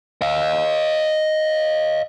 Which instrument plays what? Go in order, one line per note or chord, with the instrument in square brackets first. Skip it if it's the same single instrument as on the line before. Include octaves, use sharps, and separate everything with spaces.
[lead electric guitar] D#5 F5